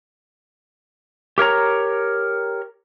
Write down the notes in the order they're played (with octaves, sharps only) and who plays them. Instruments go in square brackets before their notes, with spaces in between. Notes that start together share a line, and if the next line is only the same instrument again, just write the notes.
[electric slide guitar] G4 A#4 C#5 A#5